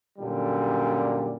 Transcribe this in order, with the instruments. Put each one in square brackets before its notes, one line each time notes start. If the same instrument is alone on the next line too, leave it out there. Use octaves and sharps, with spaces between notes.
[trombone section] F#2 A#2 D3 G3